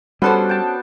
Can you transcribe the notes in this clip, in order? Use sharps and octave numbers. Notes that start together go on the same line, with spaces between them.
G3 B3 C#4 D4 F#4 A4 C5 F#5
G5 A5